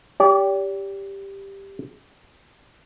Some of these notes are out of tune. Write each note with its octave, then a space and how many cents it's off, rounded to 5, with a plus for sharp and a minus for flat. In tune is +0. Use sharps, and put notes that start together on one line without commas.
G4 +5 D5 -40